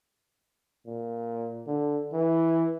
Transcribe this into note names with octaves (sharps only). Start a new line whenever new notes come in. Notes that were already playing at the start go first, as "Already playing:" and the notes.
A#2
D3
E3